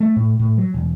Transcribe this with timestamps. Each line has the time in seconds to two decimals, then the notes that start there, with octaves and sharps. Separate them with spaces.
0.01 A3
0.16 A2
0.39 A2
0.58 F#3
0.74 E1